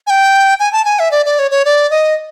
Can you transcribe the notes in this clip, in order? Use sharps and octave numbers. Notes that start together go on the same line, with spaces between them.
G#5
G5
G#5
A5
G#5
E5
D5
D5
C#5
C#5
D5
D#5